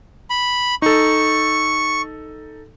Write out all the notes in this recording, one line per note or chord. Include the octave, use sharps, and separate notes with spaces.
B5
D#4 A4 C#6